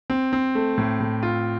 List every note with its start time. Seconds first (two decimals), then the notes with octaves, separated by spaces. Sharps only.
0.10 C4
0.33 C4
0.55 A3
0.78 A2
1.00 A2
1.23 F4